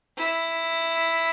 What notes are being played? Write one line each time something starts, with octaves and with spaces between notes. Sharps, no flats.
E4